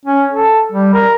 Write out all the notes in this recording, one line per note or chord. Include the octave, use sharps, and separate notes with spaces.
C#4
A4
G3
A#4